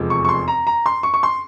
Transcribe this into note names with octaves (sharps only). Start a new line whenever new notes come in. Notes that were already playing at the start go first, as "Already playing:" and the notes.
Already playing: F1 E2 C3 F3 G#3
C#6
C#6
C6
A#5
A#5
C6
C#6
C#6
C6